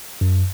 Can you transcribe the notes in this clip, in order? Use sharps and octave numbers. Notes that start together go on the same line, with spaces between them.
F#2